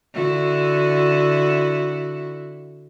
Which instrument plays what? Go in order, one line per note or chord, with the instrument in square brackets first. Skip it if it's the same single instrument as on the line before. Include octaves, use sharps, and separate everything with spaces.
[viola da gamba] D3 E4 F#4